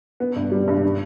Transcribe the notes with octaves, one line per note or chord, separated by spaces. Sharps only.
B3
G2
G3
G2
D4